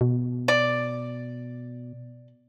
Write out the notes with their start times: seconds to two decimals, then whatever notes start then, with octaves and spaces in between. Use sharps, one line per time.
0.01 B2
0.48 D5